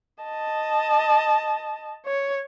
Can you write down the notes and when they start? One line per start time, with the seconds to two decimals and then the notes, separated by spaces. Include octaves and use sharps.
0.24 D#5 A5
2.06 C#5